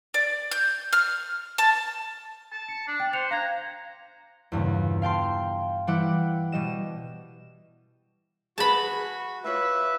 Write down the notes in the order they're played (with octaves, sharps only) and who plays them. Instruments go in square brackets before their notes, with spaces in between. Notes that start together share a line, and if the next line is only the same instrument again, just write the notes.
[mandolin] D5
G6
F6
A5
[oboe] A5
[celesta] C#7
[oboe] D4
[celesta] G5 A6
[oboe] C5 [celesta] F#6 C#7 F7
[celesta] F5 F#6 G#6 [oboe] A#5
[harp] E2 G2 A#2 C#3
F5 G5 A5 C6
E3 G3 E4 F#5 G5 D6
B2 G3 D#5 E7
[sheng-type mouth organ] F#4 [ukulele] G#4 B4 [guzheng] A5 B5
[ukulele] E4 F4 C#5 [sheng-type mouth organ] B4 E5